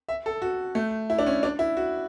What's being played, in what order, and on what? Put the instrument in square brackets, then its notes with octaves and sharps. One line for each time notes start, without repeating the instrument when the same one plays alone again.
[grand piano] E5
A4
F#4
A3
E4
D4
C#4
D4
E4
F#4